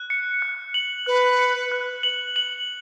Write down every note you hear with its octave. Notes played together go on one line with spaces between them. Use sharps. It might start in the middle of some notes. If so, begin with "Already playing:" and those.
Already playing: F#6
C#7
F#6
F#7
B4 F#6
C#7
F#6
F#7
F#7